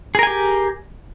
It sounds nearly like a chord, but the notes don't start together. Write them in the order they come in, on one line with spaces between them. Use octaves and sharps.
G#4 A#4 G#5 G4